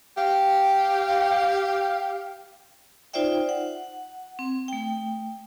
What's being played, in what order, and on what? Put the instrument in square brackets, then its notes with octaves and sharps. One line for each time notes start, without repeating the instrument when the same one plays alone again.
[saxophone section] G4 F5
[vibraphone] D#4 F4 C5 D5 E5 G5
F#5
C4
A3 G5